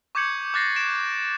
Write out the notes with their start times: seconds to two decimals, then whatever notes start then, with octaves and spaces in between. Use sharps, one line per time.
0.15 C#6 D6 G6 G#6 C#7 F#7
0.54 D6 F#6 A6 A#6 C7
0.76 A#6 C#7 D7 E7